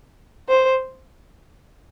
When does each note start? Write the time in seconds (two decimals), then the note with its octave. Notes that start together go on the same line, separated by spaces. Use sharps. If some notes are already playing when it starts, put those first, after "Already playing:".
0.49 C5